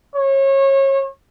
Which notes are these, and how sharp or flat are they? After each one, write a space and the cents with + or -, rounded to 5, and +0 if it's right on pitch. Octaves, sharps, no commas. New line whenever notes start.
C#5 -30